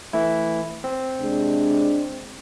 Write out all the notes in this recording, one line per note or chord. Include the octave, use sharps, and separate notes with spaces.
E3 A3 E4
C4
C3 G#3 D4